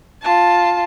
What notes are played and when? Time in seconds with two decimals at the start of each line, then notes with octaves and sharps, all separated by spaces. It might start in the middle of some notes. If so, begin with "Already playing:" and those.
0.23 F4 A5